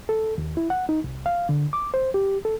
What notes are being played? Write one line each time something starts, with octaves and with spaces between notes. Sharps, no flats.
A4
D#2
E4
F#5
D#4
C2
F5
D3
D6
C5
G4
A4